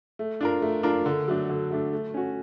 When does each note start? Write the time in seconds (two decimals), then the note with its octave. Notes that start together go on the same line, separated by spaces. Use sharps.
0.19 A3
0.41 D4 F4 A#4
0.62 A3
0.83 D4 F4 A#4
1.06 D3
1.28 F#3 A3 D4
1.49 D3
1.70 F#3 A3 D4
1.93 A3
2.14 C#4 F#4